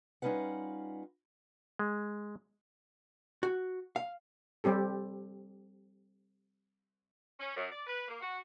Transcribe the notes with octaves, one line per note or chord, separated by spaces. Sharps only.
G3 C#4 D#4 F4 B4 F#5
G#3
F#4
F5
G3 C4 G4 A4
C#4
F#2
D5
B4
A#3
F#4